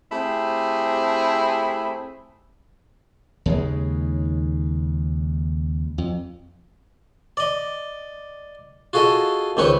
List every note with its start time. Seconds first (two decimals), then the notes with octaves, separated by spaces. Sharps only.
0.11 A3 C4 E4 G4 G#4
3.46 D#2 C#3 G#3
5.98 F2
7.37 D5 D#5
8.93 F4 F#4 G#4 A4 D#5
9.57 C#2 D#3 C4 C#4 B4 C#6